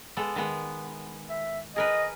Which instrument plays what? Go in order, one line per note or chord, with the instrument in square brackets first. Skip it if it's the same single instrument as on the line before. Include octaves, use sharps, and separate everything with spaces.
[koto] G#3 B3 A4
D#3 G#3 B3
[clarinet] E5
[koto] G#4 A#4 B4 [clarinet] D#5